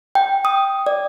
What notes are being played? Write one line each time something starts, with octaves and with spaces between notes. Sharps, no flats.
G5
D#6
D5